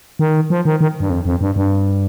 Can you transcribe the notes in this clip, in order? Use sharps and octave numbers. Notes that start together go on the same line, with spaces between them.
D#3
F3
D#3
D#3
G2
F2
F2
G2
G2